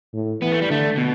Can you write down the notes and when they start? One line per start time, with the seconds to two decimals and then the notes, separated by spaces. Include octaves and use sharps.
0.14 A2
0.41 E3 B3
0.52 A3
0.62 G3
0.70 D3 A3
0.97 B2